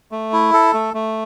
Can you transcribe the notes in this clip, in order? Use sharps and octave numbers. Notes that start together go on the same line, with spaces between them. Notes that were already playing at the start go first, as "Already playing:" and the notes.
A3
E4
A4
A3
A3